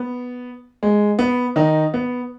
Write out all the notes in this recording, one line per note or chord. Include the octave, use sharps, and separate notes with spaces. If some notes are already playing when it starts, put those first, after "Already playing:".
Already playing: B3
G#3
B3
D#3 D#4
B3